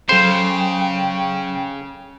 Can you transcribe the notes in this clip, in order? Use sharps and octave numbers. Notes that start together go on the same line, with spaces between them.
C#3 F#3 A4 C5 G5 C6